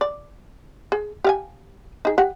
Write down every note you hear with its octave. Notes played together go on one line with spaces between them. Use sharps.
D5
G#4
G4 F5 G#5
D#4 G#4
G4 F#5